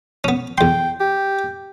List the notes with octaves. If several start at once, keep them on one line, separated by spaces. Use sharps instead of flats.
B3 C#4
E2 G5 C6
G4